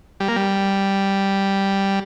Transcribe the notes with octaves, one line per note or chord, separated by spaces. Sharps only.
G3
A#3
G3